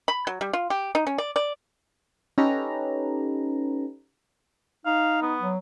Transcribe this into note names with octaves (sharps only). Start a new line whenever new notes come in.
B5
F#3
G3
F4
G4
D#4
C#4
D5
D5
C#4 D#4 G4 A4 B4 A#5
D#4 F5
B3
F#3